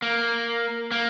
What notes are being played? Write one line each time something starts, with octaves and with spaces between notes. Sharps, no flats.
A#3
A#3